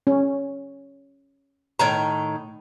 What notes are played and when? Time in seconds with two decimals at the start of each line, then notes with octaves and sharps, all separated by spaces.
0.07 C#4
1.79 A2 D#3 A#5